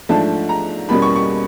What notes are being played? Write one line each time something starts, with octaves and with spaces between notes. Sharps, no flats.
G#2 F3 A3 D4 A5
A#5
E2 B2 G3 A#3 C#4 B5
C#6
C#6